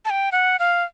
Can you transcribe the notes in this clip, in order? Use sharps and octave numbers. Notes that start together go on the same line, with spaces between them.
A5
G5
F#5
F5